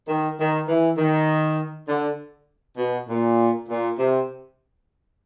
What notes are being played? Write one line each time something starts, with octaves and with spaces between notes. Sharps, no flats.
D#3
D#3
E3
D#3
D3
B2
A#2
A#2
C3